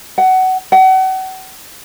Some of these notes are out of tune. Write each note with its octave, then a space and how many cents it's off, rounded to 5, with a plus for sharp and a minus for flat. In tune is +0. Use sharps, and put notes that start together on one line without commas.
F#5 +20
F#5 +35